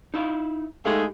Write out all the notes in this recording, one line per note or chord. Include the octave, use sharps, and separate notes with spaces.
D#4 E4 F5
G#3 A3 D#4 G4 G#4 F5